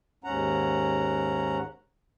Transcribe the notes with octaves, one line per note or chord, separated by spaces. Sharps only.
D#2 G#2 C#4 F#5 A#5